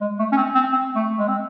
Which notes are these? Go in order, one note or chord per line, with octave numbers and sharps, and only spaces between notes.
G#3
A3
C#4
C4
C4
C4
A3
G#3
C4